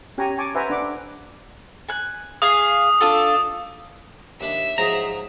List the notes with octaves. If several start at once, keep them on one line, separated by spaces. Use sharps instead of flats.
C#4 G4 G5 G#5 A#5 C#6
G#5 A5 C#6 D6
B4 C5 E5 F#5 G#5 A#5
D4 B4 F#5 D6
G#5 F#6
G#4 F5 D#6
D4 F4 A4
D#2 D4 E5 B5
G#2 F3 F#3 G#4 A#5